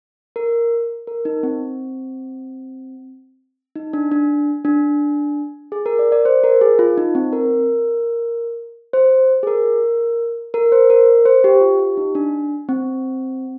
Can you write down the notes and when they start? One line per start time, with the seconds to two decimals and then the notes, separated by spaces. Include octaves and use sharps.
0.36 A#4
1.07 A#4
1.25 D#4
1.43 C4
3.75 D#4
3.93 D4
4.12 D4
4.65 D4
5.72 G#4
5.86 A#4
5.99 D5
6.12 D5
6.25 C5
6.44 A#4
6.61 G#4
6.79 F4
6.98 D#4
7.15 C4
7.33 A#4
8.93 C5
9.43 G#4
9.47 A#4
10.54 A#4
10.72 C5
10.90 A#4
11.25 C5
11.44 G4
11.61 F4
11.79 G4
11.97 D#4
12.15 D4
12.69 C4